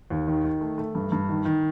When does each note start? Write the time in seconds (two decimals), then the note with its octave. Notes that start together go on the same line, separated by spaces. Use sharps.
0.10 D#2
0.27 D#3
0.44 D#3
0.61 A3
0.78 A3
0.95 G2
1.12 G2
1.29 D#3
1.45 D#3